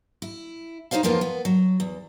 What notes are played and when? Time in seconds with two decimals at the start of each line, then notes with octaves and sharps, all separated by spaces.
0.22 E4
0.91 D#4 F#4 C5 C#5 F5
1.03 F2 E3 F3 A#3 B3 F4
1.21 B3
1.45 F#3
1.80 E2